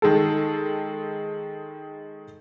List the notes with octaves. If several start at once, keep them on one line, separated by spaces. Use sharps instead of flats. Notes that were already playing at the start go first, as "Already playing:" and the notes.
D#3 G#3 A4